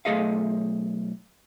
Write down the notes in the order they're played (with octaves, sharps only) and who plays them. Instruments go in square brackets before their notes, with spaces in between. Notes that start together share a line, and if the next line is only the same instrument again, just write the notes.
[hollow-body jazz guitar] B1 D#3 A3 G#4 D#5 F5